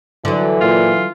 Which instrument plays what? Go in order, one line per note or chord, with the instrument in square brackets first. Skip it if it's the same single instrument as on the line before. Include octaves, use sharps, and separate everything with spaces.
[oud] D3 F#3 [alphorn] E3
[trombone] A#2 [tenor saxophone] F4